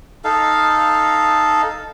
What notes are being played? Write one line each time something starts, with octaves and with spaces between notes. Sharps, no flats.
D#4 A4 F5